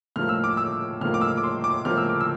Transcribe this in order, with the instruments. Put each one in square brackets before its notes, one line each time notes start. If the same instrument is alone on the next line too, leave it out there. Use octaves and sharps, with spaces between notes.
[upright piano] A2 F3 A#3 F6
E6
D6
E6
A2 F3 A#3 F6
D6
E6
D6
C6
D6
A2 F3 A#3 F6
E6
D6
E6